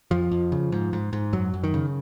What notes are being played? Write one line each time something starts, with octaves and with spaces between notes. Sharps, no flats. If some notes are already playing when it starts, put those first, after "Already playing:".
F2 F3
F2
C#3
G#2
G#2
G#2
F#2 F#3
F#2
D#3
C#3